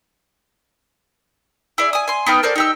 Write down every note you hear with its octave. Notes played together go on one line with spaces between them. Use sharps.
E4 G#4 D5
G#5 D#6
G#5 C6
B3 D#4 G5 F6
A4 A#4 C5 D5
D#4 G4 E6